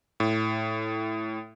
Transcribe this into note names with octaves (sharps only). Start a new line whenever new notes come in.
A2